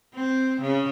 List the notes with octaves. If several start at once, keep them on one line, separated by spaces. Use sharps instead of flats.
C4
C#3